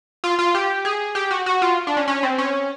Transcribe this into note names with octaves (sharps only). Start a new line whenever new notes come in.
F4
F4
G4
G#4
G4
F#4
F#4
F4
D4
C#4
C#4
C4
C#4